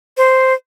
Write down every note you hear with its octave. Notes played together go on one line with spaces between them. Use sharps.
C5